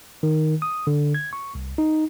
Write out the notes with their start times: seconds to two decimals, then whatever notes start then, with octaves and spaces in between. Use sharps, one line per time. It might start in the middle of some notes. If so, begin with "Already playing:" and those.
0.23 D#3
0.62 D#6
0.87 D3
1.14 G#6
1.33 C#6
1.55 C2
1.78 D#4